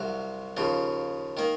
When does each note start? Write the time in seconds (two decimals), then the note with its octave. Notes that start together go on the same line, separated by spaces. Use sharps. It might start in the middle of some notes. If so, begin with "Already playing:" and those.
Already playing: C2 C3 F#3 F5
0.57 D#2 C#3 F3
1.37 D#3 A#3